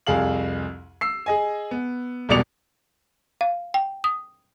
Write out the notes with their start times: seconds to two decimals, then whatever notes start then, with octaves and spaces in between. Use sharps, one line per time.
0.07 C2 F2 G#4 F5 F#7
1.01 E6 C7
1.26 G#4 D#5 G#5
1.71 B3
2.29 E1 C2 B2 D5 C#7 F7
3.41 F5
3.74 G5
4.04 D#6